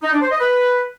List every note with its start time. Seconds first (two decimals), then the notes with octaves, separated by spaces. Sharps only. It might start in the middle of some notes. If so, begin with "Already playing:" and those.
0.03 D#4
0.12 D4
0.21 C5
0.31 D#5
0.40 B4